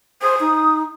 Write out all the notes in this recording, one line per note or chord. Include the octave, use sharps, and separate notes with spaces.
C5 D#6
D#4